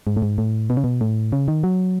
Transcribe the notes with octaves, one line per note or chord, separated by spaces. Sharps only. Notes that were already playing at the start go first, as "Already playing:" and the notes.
G#2
A2
G#2
A2
B2
C#3
B2
A2
C#3
D#3
F#3